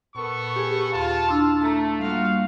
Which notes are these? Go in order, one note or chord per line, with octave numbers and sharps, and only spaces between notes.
A#2 B3 A4 A#4 C#6
G4 G#4
D#2 F4 F5 A5
D4 E4 C6 D6 E6
A3 A5 A#5
G3 A#3 F4 F#4 F5